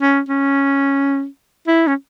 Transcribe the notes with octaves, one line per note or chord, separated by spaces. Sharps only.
C#4
C#4
E4
C#4